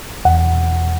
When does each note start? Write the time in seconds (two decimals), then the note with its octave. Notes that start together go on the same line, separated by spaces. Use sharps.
0.25 E2 F#5